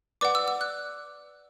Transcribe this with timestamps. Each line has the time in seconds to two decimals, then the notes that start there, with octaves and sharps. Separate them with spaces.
0.21 B4 D5 F#5 D6
0.35 E6
0.48 E6
0.61 F#6